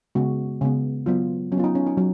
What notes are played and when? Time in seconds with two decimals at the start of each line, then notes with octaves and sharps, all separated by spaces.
0.15 C#3 G#3 B3 F#4
0.61 C#3 G#3 B3
1.06 F#3 B3 F4
1.52 F#3 C#4
1.57 B3 F4
1.64 D#4
1.75 C#4
1.86 D#4
1.97 F#3